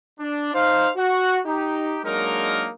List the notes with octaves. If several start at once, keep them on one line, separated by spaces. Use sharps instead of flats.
D4
D#4 C5 F5
F#4
D#4 G4
F#3 G#3 A#3 D4 D#4 A#4